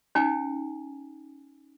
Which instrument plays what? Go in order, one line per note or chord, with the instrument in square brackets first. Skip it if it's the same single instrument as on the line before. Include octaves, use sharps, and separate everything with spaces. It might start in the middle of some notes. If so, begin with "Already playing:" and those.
[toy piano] C#4 D#4 G5 G#5